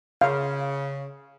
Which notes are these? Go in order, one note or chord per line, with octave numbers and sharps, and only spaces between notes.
C#3 F5